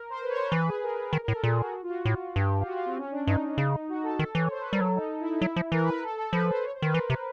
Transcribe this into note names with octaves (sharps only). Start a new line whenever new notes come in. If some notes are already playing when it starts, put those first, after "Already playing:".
Already playing: A#4
C5
B4
C#5
C5
E3 B4
G#4
A#4
D#3 A#4
A#4
A2
A4
A#2 G#4
F#4
F#4
F4
F#4
A2
G2 G4
F4
F#4
F4
C4
C#4
D4
G2 D#4
C#3
F#4
A4
D#3 A4
E3 C#5
C5
B4
G3 A#4
F#3 A4
D#4
E4
D#4
F#3 E4
F3
E3 A#4
B4
B4
A4
A4
F3 B4
C5
C#5
C5
D#3 B4
E3 A#4
C3